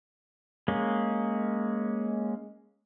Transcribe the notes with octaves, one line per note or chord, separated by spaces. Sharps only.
G#3 A#3 C#4